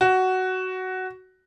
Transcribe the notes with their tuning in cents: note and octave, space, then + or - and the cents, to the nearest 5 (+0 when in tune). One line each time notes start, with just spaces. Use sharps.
F#4 +10